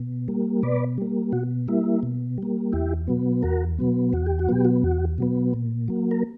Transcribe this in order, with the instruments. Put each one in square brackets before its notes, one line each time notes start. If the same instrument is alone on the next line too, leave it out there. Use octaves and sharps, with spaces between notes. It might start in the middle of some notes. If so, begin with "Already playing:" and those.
Already playing: [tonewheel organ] B2
G3 A#3
B2 B4 D5
G3 A#3
B2 F#4
G3 A#3 E4
B2
G3 A#3
E2 E4 G4
B2 F#3 B3
E2 F#4 A#4
B2 F#3 B3
E2 F#4
G4
F#4
B2 F#3 B3 G4
F#4
E2 F#4
B2 F#3 B3
A#2
F#3 A#3
A#4